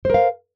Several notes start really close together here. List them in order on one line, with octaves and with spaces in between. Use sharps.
C5 A#4 F5